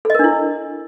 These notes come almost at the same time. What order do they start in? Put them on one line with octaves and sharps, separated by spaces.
A4 D#5 A#4 D4 E4